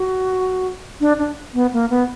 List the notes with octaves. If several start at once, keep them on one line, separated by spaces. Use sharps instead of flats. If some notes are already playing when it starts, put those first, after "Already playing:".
Already playing: F#4
D4
D4
B3
A#3
B3